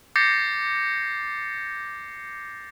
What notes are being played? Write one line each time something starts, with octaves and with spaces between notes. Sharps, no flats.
D6 G6 A6 A#6 C7 C#7